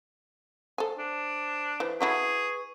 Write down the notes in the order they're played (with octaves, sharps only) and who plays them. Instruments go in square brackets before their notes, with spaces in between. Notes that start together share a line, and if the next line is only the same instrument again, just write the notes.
[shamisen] A4 G#5 [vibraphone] C5
[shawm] D4
[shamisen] E3 [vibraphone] B4 C5
[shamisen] E4 F#4 A4 [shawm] G#4 [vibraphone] B4 C#6